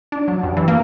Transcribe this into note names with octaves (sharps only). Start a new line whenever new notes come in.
D4
F#3
G2
E3
A#3